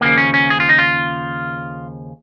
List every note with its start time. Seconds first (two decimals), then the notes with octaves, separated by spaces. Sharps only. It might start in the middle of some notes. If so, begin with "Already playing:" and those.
0.01 D#2 C#3 F3 A#3
0.18 C#4
0.34 C#4
0.50 G#4
0.60 F4
0.69 D#4
0.79 F4